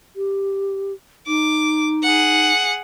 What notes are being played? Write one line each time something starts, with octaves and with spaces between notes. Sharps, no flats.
G4
D#4 D6
G#4 F#5